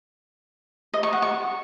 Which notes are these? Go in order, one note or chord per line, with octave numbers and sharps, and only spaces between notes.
D#5
C#6
F#5
C#6